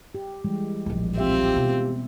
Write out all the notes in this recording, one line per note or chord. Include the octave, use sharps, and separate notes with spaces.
G4
E3 G3 G#3
D1 A#1
G#1 C4 F4 G4 E5
B2